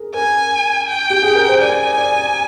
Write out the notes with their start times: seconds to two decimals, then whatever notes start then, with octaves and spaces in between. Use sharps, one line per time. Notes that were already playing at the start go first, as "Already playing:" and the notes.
Already playing: G#4 A#4
0.14 A#4 G#5
0.88 G5
1.10 G4
1.22 G#4
1.35 A#4
1.48 C5
1.61 D5 G#5
1.98 D5